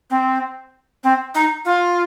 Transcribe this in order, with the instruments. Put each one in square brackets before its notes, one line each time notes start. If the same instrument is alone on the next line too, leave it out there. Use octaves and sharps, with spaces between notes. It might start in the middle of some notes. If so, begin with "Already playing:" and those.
[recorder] C4
C4
D#4
F4